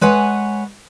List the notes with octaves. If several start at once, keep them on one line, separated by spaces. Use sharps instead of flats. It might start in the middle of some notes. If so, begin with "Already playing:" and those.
G#3 B4 C#5 F#5 G#5